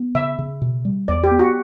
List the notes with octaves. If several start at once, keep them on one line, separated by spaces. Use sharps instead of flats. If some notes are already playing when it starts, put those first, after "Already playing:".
Already playing: B3
C#3 E5
C#3
B2
G3
E2 D5
G4
B3
F#4